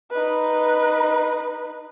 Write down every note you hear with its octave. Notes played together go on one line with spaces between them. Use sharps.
D#4 B4